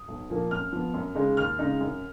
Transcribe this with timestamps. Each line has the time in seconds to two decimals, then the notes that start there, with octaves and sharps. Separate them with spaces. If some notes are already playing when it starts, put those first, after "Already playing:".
Already playing: D#6
0.08 B1
0.30 A#2 F3 A#3
0.51 F#2 F6
0.73 F3 B3
0.94 F#2
1.15 C#3 G#3 D#4
1.37 D#2 F6
1.59 C#3 G#3 D#4
1.81 F#2